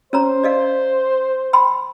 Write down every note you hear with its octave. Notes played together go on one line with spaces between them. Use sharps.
C#4 C5 C#5 A#5
D5 D#5 F5
G5 B5 C6